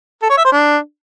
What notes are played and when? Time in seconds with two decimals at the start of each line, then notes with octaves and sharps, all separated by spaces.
0.23 A4
0.30 C#5
0.37 E5
0.45 C5
0.52 D4